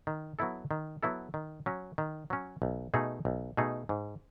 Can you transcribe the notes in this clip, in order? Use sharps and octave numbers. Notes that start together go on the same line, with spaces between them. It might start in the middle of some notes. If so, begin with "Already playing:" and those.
D#3
F#3 B3 E4 A4
D#3
F#3 B3 E4 A4
D#3
F#3 C#4
D#3
F#3 C#4
B1
B2 A3 D#4 G#4
B1
B2 A3 D#4 G#4
G#2